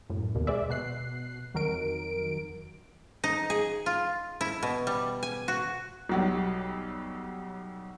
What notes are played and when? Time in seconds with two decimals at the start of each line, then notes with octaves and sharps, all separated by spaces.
0.10 F#2 A2
0.35 D#2 B2
0.47 G#3 C5 D5 E5
0.70 B2 F#6 C7
1.54 F2 D#3 F#3 A#4 D7
3.24 D#4
3.50 G#4
3.86 F4
4.41 E4
4.63 B2
4.87 G3
5.23 G#5
5.48 F#4
6.09 B1 F#3 G3